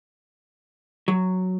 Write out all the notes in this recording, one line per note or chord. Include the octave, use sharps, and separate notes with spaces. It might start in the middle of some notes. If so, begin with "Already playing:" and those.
F#3